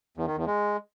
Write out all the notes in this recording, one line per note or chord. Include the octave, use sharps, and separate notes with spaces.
E2
D#3
E2
G#3